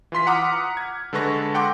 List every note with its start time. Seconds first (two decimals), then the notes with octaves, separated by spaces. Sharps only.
0.12 E3 F4 C6 B6
0.27 F#5 A#5 D6 D#6 F6
0.77 G#6
1.13 D3 G#3 A4 B4 C#6 A#6
1.54 F#5 G5 C6 D6